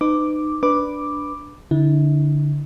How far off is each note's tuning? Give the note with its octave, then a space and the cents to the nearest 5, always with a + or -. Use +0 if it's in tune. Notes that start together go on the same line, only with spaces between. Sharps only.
D#4 -30 B4 +35 D6 +0
D4 +0 B4 +0 D6 +0
D3 -10 E4 -40